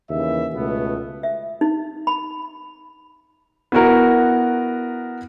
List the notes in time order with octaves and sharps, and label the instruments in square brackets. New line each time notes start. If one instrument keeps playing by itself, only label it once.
[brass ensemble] D#2 C#3 E3 E5
C#2 B2 A3 B3
[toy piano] E5
D#4
B5
[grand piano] B3 E4 F#4 A#4